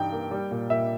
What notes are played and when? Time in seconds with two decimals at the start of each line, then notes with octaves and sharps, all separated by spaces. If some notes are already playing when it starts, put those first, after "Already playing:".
Already playing: G2 E3 D#4 G5
0.13 A#3
0.31 G3
0.51 A#2
0.70 A#2 E5